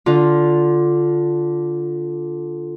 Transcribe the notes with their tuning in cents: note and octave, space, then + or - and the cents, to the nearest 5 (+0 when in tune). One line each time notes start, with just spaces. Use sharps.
D3 -5 F4 +0